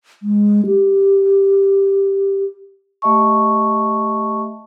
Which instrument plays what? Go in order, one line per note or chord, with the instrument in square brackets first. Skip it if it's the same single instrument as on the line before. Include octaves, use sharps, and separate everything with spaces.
[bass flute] G#3
G4
[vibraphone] A3 G4 D#5 E5 A5 C#6